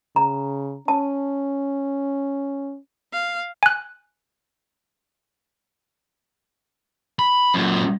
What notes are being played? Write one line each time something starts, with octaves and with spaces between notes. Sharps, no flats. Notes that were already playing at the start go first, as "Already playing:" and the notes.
C#3 A#5
C#4 A5
F5
G#5 F#6
B5
F#2 A#2